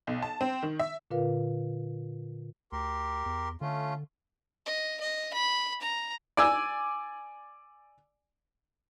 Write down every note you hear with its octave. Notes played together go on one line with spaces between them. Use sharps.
B1
A5
C4
D#3
E5
A#2 D3 F4 A#4 B4 F5
D2 G4 A#4 C6
E2
D3 A3 C#4 F4
D#5
D#5
B5
A#5
D5 G#5 E6